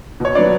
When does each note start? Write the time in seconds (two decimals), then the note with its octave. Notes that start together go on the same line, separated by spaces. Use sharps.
0.20 B2 C#5
0.35 F#3 B3 D4 D5